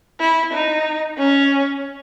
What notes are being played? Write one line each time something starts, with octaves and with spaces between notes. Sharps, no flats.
E4
D#4
C#4